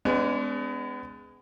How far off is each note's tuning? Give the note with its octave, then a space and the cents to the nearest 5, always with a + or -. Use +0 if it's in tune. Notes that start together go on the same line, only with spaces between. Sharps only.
G#3 +0 B3 +35 D4 -30